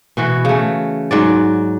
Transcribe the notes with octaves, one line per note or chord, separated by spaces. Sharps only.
B2 E3 F#4
C#3 A3
G#2 F#3 D5